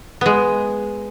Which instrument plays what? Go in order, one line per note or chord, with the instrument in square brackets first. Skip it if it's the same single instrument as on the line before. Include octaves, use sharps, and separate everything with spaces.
[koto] G#3 B3